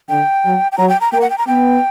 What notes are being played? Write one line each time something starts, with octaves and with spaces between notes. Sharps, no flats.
D3 G5
F#3
G5
F#3 A#5
G5
A#5
A#3 G5
F#5
G5
A#5
B3 G5